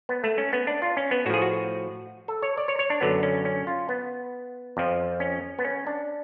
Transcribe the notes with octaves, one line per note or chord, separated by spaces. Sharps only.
B3
A3
C#4
B3
D4
F4
C#4
B3
A2 F3 F#4 G#4
F#4
A4
C#5
D5
C#5
C#5
D4
F#2 D3 F#3 B3
C#4
C#4
F4
B3
F2 F3
C#4
B3
C#4
D4